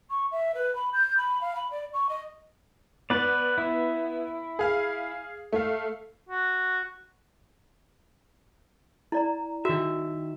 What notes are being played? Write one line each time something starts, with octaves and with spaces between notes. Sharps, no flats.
C#6
E5
B4
B5
G6
B5
F5
B5
D5
C#6
D#5
B3 B4 D5
E4
G#4 F5
A3 F5
F#4
E4 D5 A#5
D#3 F#4 E5